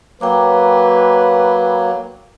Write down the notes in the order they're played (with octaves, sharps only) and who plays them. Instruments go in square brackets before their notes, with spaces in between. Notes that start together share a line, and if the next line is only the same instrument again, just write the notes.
[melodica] F#3 A#3 [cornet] B4 [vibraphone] G5 A#5 D6